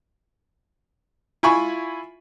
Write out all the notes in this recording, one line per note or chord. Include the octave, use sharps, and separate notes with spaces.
E4 F4 G#5 B5 C#6